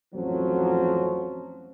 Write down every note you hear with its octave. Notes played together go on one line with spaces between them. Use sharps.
A1 F2 F3 F#3